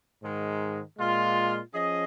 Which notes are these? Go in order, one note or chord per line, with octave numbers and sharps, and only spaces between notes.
G#2 D#3 G#3
A#2 G#3 F4
F3 C#4 G#4 D#5